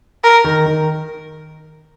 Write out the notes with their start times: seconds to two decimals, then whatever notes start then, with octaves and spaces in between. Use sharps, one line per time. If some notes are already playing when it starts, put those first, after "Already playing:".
0.24 A#4
0.44 D#3
0.66 D#3